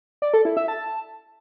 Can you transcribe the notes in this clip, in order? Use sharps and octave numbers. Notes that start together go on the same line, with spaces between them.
D5
A4
E4
E5
A5